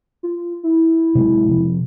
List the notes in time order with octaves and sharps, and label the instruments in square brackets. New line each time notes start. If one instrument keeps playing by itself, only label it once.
[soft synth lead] F4
E4
[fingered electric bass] C3 F#3 G#3
C3 F3